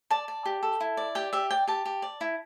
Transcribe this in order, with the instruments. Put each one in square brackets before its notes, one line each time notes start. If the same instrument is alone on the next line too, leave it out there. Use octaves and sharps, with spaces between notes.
[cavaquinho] D5 A5
D5
G4
A4
E4
D5
G4 G5
G4 E5
D5 G5
G4 A5
G4
D5
E4